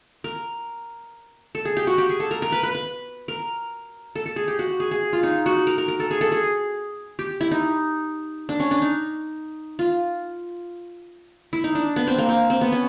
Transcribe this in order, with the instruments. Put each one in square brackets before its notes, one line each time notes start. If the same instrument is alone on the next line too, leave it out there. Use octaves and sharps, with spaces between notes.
[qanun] A#4
A4
G#4
G4
F#4
G4
G#4
A4
A#4
A#4
B4
B4
B4
A#4
A4
A4
G#4
G4
F#4
G#4
G#4
F4
D#4
F#4
A#4
A#4
A#4
A4
G#4
A4
G#4
G4
E4
D#4
D4
C#4
D4
D#4
F4
E4
D#4
D4
B3
C4
A#3
C4
C4
B3
C#4